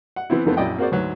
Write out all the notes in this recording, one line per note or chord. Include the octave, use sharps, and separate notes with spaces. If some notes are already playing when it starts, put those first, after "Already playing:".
F#5
E3 B3 C4 E4
F2 D#3 E3 A3 B3 C4
A#1 F#2 E4 D5 D#5 G5
A#3 C4 F#4 G#4 C5 D5
D2 G#2 F#3 B4